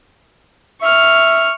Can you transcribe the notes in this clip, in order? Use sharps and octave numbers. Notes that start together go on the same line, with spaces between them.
E5 C#6 F6